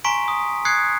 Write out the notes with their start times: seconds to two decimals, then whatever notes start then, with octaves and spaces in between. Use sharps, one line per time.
0.04 G#5 A#5 C6 C#6 B6 D7
0.28 D#6
0.65 D#6 F#6 G#6 C7 C#7